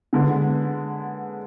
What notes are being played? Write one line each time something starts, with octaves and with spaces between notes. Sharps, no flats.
D3 G#3 B3